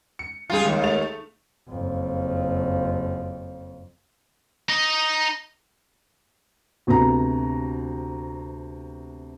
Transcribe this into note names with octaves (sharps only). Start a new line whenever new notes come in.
C#7
C#2 G3 F4 G#4 F5
D#2
A3 A6 F7
F#1 F2
D#4 D#5
D2 C3 B3 A#5